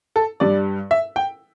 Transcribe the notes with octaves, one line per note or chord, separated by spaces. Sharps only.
A4
G2 G3 D5
E5
G5